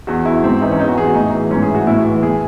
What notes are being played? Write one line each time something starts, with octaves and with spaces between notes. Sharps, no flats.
E2 F#4
E2 E4
G#2 C4
E3 D#4
C#4
E2 D#4
F#4
E2 G#4
F#4
A2 D#4
E3
G#2 C#4
G#4
E3
F#4
A2 E4
E3
A2 G#4